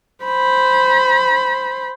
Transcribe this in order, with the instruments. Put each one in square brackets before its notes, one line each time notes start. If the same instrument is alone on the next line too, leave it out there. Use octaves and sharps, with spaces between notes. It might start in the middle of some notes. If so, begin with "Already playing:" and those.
[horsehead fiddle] C5 B5